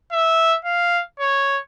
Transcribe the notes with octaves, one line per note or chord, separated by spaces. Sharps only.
E5
F5
C#5